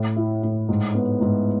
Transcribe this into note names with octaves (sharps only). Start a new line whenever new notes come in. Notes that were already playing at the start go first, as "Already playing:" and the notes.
Already playing: A2
E4
A2
G#2
B3
G#2